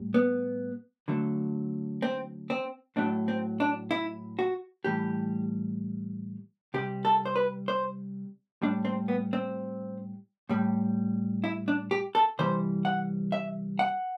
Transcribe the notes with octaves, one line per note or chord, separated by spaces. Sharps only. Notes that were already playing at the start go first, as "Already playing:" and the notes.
Already playing: A2 G3
B3
D3 F#3 A3
C4
C4
A2 F#3 A3 D4
C4
D4
E4
F#4
A2 E3 G3 G4
C3 G3 G4
A4
C5
B4
C5
A2 G3 D4
C4
B3
C4
A2 G3
E4
D4
G4
A4
C3 E3 G3 C5
F#5
E5
F#5